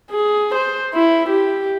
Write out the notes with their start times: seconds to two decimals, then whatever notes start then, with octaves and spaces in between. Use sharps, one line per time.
0.11 G#4
0.55 C5
0.95 E4
1.29 G4